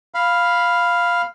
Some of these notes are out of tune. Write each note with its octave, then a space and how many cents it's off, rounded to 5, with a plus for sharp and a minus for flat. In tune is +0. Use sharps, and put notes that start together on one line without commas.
F5 +0 B5 +0